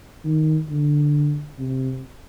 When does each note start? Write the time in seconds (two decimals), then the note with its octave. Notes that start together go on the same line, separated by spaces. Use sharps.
0.25 D#3
0.70 D3
1.59 C3